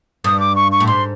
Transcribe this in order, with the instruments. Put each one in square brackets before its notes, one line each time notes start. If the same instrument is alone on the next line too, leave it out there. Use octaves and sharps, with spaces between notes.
[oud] G2 [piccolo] D#6
[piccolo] D6
C#6
C#6
[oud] A2
[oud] G#2 [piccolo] C6